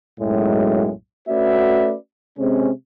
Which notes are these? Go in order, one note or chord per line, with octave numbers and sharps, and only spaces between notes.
B1 F#2 A2 G#3
A3 C#4 F#4 B4 D5 E5
C3 G#3 C4 C#4